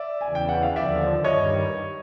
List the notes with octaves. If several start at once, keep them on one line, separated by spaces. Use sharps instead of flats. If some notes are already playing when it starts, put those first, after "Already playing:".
Already playing: D5 E5
G#5
E2 C#3 E3
G5
F#5
F5
D#2 D3 F3 D5 E5
G2 D#3 G3 C#5 D#5